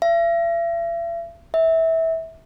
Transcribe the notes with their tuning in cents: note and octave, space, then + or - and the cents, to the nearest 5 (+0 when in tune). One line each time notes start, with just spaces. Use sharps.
E5 +45
E5 -20